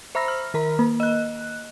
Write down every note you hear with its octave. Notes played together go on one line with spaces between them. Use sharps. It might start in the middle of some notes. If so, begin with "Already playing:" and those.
C5 E5 A#5 B5 E6 A#6
F6
D#3 A#4 A#5
A#3
D#5 F#6